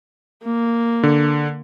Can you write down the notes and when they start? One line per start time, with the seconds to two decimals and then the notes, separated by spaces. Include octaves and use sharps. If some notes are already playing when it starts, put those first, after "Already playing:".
0.43 A#3
1.03 D3